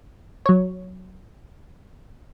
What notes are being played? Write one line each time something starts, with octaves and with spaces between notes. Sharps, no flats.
F#3 C#5